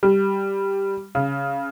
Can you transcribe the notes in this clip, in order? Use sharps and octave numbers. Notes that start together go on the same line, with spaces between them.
G3
C#3